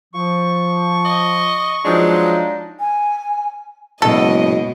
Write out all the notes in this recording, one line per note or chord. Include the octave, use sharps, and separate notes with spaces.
F3 C#6
D#5
F3 F#3 G#3 D4 D#4
G#5
F#1 B2 G#3 A4 D#5